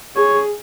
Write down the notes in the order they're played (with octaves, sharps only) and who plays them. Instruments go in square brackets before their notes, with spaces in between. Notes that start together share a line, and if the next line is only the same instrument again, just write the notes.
[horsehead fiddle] G#4 [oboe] C#5